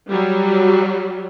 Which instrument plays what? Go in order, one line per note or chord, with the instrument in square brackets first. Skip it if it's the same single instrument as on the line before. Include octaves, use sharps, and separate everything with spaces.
[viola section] F#3 G3